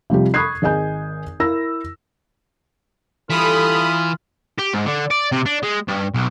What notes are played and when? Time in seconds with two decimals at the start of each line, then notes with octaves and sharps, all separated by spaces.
0.10 C3 F3 G3 G4
0.34 B5 C#6 D#6 F#6 G#6 C7
0.62 G#1 G#4 D#5 G#5 G6
1.40 E4 A#4 E6 A#6
3.30 D3 E3 G3 F4 A4 B5 D#6
4.59 G4
4.74 G#2
4.86 D3
5.11 D5
5.32 C3
5.46 D4
5.63 G#3
5.88 G2
6.14 B1